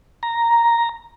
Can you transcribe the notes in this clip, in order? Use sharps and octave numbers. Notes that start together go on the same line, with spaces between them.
A#5